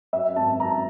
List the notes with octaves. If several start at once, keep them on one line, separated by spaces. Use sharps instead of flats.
F#2 E5
G#1 A5
F#2 A#5